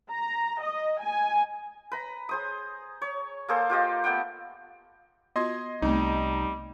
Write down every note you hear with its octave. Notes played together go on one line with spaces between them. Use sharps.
A#5
D#5
G#5
B4 A#5
G#4 C5 D#6
C#5
A#3 G#4 A4 C5
F4 G4 D#5
A3 B3 F#5 G5
B3 F4 F#4 D#5 C6 G#6
C2 G3 A3 B3 C4 D#4